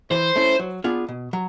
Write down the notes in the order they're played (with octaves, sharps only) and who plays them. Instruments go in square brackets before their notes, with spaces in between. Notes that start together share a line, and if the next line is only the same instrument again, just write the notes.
[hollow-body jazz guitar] E3 [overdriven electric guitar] C5
[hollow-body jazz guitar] A3 C#4 E4
F#3
B3 D4 F4 G#4
B2
F#3